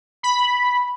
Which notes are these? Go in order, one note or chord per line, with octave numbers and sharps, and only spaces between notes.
B5